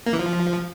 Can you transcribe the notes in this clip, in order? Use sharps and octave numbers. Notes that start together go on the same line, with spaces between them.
A#3
E3
F3